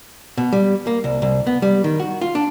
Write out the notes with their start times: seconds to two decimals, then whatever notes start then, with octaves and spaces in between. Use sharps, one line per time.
0.37 B2
0.53 G3
0.87 A#3
1.04 C2
1.22 C2
1.47 B3
1.62 G3
1.84 D#3
2.00 F#4
2.21 F4
2.35 D4